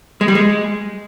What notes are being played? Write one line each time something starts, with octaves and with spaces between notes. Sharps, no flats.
G#3
G3
G#3